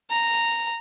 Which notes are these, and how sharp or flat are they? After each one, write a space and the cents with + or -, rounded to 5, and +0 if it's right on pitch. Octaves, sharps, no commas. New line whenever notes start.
A#5 -10